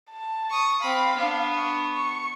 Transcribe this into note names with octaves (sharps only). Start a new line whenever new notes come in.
A5
C#6 D#6
C4 F5 B5
B3 D4
C#6
C#6